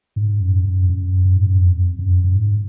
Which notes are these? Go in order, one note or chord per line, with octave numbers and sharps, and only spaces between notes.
G#2
F#2
F#2
F#2
F#2
G#2
F#2
F2
F#2
F#2
G#2